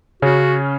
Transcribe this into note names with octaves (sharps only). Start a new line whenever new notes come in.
C#3 C#4 F#4